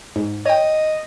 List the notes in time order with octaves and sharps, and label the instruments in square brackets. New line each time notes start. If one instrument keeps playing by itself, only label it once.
[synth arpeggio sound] G#2
[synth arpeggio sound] C#5 G5 [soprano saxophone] D#5